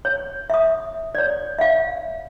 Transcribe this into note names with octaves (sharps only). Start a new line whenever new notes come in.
C#5
E5 D#6
C#5 D5
E5 F5